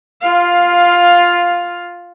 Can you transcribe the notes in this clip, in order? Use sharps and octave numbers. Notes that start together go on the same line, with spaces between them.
F4 F5